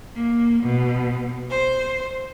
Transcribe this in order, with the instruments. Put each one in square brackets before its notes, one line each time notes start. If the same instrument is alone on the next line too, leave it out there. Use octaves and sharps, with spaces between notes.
[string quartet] A#3
B2
C5